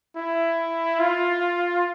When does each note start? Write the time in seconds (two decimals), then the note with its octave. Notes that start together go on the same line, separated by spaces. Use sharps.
0.16 E4
0.99 F4